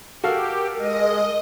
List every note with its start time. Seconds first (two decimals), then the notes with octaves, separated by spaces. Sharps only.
0.24 F#4 G4 A4 A#4 F5
0.78 G#3 D#5